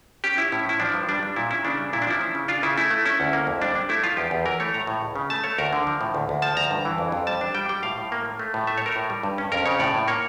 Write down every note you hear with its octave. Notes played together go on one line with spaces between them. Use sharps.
C#4 G4
C#4 E4
A2 E4
F3 E4
F3 D4
G2
G3 D4
G3 D4
A#2 E4
C#4 E4
C#3 D4
G3
A#2 E4
D4
F3 E4
C#4
C#3
D4 F4
C#3 E4
A3 E4
A3
C#4 E4
D2
A#3
F2
G3 D4
D4
A3 E4
F3 F4
E2 G4
E2
E3 A#4
A3 C#5
A2 A#5
A2
C#2
C#3
A3 A5
A3 C#5
D2 A#4
D3
F3
A2
D2
D2
F3 A5
D2 A#5
G2
E3
F2
F2
G3 A5
D4
G3 G5
G3 G5
A2 F5
A2
A#3
A#3
A3
A2
A3 E5
C#5
A3 A#4
A2
G3
G2
C#4
F2 A#4
C#3 C#5
A2 D5
A2
A#3 C#5